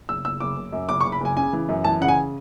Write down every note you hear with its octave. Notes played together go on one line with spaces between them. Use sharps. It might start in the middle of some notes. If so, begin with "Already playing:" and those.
F#1 E6
F#1 E6
F#1 D6
F#1
F#2
F#1 D6
C#6
F#1
B5
F#1 G#5
C#3 G#5
E3
F#2
E3 A5
C#3 F#5
G#5